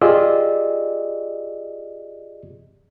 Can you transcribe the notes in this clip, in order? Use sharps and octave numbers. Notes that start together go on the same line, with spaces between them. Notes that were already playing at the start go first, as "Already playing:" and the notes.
F4 G4 G#4 D5 D#5 E6